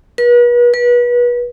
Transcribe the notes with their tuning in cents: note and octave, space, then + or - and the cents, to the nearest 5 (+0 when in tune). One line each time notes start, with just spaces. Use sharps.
B4 -40
B4 -30